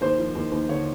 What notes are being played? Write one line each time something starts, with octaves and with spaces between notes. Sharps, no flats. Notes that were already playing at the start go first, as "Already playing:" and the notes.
D#2 C5
F3
D#2
D#2
D3 C#5